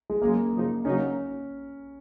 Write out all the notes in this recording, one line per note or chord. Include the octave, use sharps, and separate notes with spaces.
G#3
F#2 C#3 G#3 A#3
F#2 C#3 F3 G#3 D#4
C#3 F#3 A#3 C#4 D#4